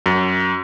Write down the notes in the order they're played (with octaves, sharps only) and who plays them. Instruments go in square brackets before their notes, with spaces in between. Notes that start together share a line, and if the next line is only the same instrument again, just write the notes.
[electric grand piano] F#2